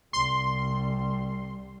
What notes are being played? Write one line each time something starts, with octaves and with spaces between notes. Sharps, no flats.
C2 G3 C6